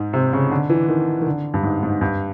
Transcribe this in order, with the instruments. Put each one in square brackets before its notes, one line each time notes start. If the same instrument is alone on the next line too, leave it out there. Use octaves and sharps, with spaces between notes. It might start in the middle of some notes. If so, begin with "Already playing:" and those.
Already playing: [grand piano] G#2
C3
C#3
D3
E3
D#3
D#3
D3
G2
G#2
G#2
G2